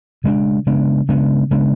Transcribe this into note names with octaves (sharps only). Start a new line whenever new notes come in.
C#3 G#3 B3 D4
C#3 G#3 B3 D4
C#3 G#3 B3 D4
C#3 G#3 B3 D4